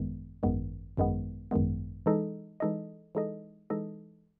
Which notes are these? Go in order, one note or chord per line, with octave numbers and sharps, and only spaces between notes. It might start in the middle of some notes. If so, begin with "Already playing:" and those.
Already playing: G#1 F#2 D#3 G#3 B3
G#1 F#2 D#3 G#3 B3
G#1 F#2 D#3 G#3 B3
G#1 F#2 D#3 G#3 B3
E3 G#3 D#4 A4 D#5
E3 G#3 D#4 A4 D#5
E3 G#3 D#4 A4 D#5
E3 G#3 D#4 A4 D#5